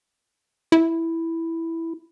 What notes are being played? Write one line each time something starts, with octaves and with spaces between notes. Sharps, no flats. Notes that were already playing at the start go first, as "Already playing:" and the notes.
E4